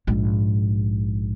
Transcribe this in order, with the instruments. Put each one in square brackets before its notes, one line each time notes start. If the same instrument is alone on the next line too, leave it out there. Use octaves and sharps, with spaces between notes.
[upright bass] A#1 G#2